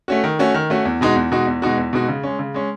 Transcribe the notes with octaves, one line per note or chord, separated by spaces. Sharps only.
A3 C#4 F#4
D#3
A3 C#4 F#4
D#3
A3 C#4 F#4
E2
B2 G#3 D#4 F#4
E2
B2 G#3 D#4 F#4
E2
B2 G#3 D#4 F#4
E2
B2 G#3 D#4 F#4
C#3
G#3 C#4
C#3
G#3 C#4